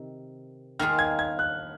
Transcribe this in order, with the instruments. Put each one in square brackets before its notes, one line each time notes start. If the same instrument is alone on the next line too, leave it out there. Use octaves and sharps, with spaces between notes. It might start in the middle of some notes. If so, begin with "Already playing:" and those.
Already playing: [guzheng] C3 D#3
[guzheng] D#3 A#3 F4 G#4 [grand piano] F6
[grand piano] G#6
G#6
F#6